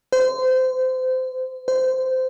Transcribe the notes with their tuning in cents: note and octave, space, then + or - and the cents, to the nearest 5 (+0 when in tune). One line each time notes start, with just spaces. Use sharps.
C5 -25
C5 -20